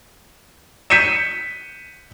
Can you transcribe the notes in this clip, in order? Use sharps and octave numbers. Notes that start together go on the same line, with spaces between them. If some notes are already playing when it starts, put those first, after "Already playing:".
G6 B6 C#7 D#7 E7